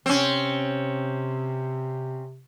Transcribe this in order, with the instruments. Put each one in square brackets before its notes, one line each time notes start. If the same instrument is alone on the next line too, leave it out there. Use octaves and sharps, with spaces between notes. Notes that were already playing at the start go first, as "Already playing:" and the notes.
[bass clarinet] C3 [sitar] C4 C#4